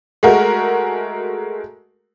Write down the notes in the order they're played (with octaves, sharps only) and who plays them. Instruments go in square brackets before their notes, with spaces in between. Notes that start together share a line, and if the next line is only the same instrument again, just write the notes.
[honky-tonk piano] G#3 A3 F#4 A#4